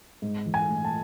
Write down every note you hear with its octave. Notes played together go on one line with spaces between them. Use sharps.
G#2
E3
G#5
A3
A5